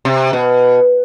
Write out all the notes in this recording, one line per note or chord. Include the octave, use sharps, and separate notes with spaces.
C3
B2